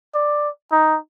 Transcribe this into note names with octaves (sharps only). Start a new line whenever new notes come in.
D5
D#4